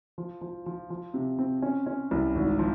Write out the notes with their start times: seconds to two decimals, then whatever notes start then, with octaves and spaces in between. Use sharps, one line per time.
0.18 F3
0.41 F3
0.66 F3
0.90 F3
1.14 C3
1.39 C4
1.62 C#4
1.86 C#4
2.11 C2
2.35 G#1
2.59 F3